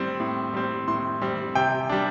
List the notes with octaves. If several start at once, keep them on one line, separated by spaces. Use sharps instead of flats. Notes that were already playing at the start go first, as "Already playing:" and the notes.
Already playing: A2 G3 C4
A2
G3 C4
A2 C6
G3 C4
C3 G5
G3 D4